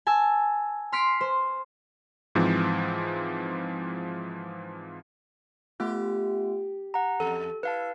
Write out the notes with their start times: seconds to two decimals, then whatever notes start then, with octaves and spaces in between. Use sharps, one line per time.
0.07 G#5 A5 E6 A6
0.92 C6 F6 B6 C7 D7
1.21 C5
2.35 G#2 E3 F3 C4
5.80 A3 B3 F4 G4
6.94 F#5 A#5
7.20 E2 A4
7.63 E4 B4 F5 A5